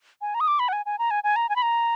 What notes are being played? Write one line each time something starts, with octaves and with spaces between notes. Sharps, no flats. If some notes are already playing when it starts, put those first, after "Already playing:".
G#5
A#5
D#6
D6
B5
F#5
G#5
G#5
A#5
G#5
G#5
A#5
G#5
B5
A#5